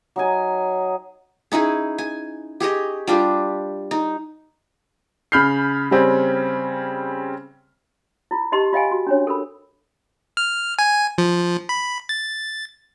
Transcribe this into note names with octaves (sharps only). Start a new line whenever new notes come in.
F#3 D#4 G#5
C#4 D#4 E4 G#4
G#5
G4 G#4 C#5 D#5
G3 D4 F4 G4
D#4
C#3 B5 F6 G6 C7
C#3 G3 C4 C#4
E4 F4
D#4 G4 D#5 A5 C6 C#6
F4 D#5 F5 G5 G#5
F#4
C#4 D4 C#5
A4 A#4 B5
F6
G#5
F3
B5
A6